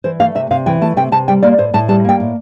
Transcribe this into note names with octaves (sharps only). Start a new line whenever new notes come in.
E3 C5
A3 F5
C3 E5
C3 F5
E3 G5
A3 A5
C3 G5
C3 A5
G3 G5
A#3 D5
A2 C5
A2 A5
G3 A5
A#3 G5
A2